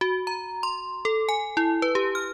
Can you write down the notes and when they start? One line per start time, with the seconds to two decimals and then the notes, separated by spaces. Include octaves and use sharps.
0.01 F#4
0.27 A#5
0.63 C6
1.05 A4
1.29 G#5
1.57 E4
1.82 B4
1.95 G4
2.15 F6